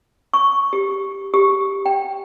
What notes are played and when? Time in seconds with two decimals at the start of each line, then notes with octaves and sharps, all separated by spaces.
0.34 C#6
0.73 G4
1.34 G4
1.86 G5